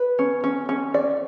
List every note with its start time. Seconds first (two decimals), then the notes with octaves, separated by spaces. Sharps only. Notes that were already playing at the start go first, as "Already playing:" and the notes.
Already playing: B4
0.19 C#4
0.44 C#4
0.69 C#4
0.94 D5